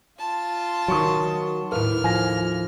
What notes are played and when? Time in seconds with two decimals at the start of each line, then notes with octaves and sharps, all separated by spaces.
0.19 F4 A5
0.88 D#3 F#3 C6 C#6 D#6
1.72 D#2 A2 A#4 B4 F6
2.04 F3 G#5 A#6